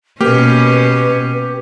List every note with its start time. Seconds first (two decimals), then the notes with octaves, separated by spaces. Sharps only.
0.21 B2 A#3 C#4 G4 B4